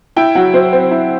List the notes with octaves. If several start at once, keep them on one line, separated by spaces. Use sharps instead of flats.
E4 G5
F#3 F#5
F#3 C5
C4
E4